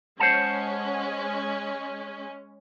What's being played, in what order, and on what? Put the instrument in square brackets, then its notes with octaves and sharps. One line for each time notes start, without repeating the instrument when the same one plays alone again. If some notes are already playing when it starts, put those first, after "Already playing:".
[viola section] G#3 C#4 [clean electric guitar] C5 F#5 A5